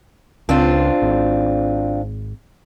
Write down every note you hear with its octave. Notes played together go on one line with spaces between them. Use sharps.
C#2 C4 D4 F4
G#1